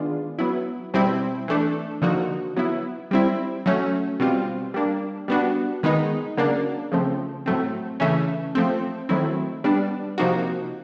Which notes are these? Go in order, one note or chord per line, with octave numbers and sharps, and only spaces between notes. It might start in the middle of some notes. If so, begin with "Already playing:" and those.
Already playing: D#3 G#3 B3 D4 F4
F#3 B3 E4
B2 G3 C4 E4
E3 A3 D4
D3 F3 A#3 D#4 F#4
F#3 B3 E4
G3 C4 E4
F#3 A3 C#4
B2 G3 C4 F4
G3 A#3 D4
G3 B3 D4 F#4
D#3 G#3 B3 D#4
C#3 F#3 A#3 D4
C#3 F3 A3 C4
A2 F#3 A3 C4
C#3 E3 A3 C#4
F3 A3 C4
D#3 F#3 A3 C4 E4
G3 B3 D4
C3 F3 A#3 D#4 F#4